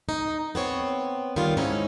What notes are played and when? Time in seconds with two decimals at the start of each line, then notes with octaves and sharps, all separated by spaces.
0.09 D#4
0.55 B3 C4 C#5
1.36 D#3 G3 B3 E4 F4
1.57 G#2 C#4 D#4 E4